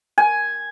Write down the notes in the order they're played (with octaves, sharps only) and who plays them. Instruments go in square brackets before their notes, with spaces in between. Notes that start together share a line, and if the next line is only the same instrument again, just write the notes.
[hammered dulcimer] G#5